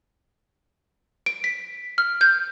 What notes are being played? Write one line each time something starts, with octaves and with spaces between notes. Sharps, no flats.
D7
B6
F6
G6